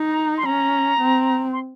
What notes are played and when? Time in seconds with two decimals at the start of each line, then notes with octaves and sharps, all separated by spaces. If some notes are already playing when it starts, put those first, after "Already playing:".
Already playing: D#4
0.10 A#5
0.38 C6
0.46 C#4 A#5
1.00 C4
1.53 C6